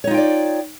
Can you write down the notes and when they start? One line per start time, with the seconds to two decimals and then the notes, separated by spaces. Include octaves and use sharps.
0.04 C#5
0.07 D#4
0.11 F4
0.14 G5
0.17 D5